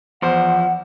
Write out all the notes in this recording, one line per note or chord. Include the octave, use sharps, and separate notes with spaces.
E2 F3 C5 F#5